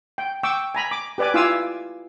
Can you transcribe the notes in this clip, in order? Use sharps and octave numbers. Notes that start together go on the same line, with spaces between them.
G5
G5 C#6 D6 E6
G#5 A#5 B5
D6
G4 B4 D5 G#5 D6
E4 F4 F5 G#5 D6 E6